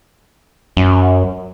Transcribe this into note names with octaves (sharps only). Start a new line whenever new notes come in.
F#2